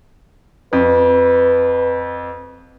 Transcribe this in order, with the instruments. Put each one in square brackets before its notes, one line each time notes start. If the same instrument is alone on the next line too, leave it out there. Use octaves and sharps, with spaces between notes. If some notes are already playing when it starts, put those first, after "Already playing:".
[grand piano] F2 [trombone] B4